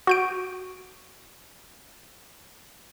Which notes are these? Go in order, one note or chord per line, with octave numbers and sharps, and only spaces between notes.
F#4 G6 D7